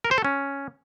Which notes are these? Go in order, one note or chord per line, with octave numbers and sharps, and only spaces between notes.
A#4
C5
A4
C#4